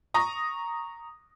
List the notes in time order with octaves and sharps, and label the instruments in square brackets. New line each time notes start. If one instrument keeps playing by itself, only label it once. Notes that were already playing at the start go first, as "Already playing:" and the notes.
[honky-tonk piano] A#5 C#6 D#6 A#6